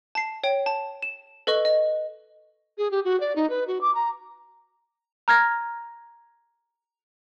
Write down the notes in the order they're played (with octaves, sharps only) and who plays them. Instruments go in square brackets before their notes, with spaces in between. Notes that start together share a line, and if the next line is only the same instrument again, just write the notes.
[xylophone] A5 C7
C#5 G5
A5
E7
A4 B4 D#5 C#6
D#5
[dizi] G#4
G4
F#4
D5
D#4
B4
F#4
D6
A#5
[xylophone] A#5 F6 G#6 A#6